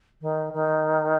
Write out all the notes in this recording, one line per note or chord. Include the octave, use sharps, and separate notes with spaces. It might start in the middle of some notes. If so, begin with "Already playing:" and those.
D#3
D#3